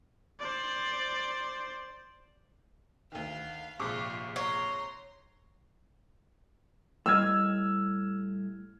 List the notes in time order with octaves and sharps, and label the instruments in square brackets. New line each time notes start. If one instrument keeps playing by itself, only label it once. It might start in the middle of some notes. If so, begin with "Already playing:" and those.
[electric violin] C5 D5
[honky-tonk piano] D2 D#3 [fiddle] F5
[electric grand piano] A#1 C3 [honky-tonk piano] G#2 C#6 D6 [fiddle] F4
[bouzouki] C#5 [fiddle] A#5 C6
[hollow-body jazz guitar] A2 G3 D#5 [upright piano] E6 F6 G#6